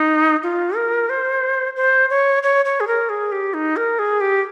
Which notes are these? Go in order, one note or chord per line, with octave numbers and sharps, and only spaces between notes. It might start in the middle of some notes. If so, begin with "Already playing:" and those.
Already playing: D#4
F4
A#4
C5
C5
C#5
C#5
C#5
G#4
A#4
G#4
G4
D#4
A#4
G#4
G4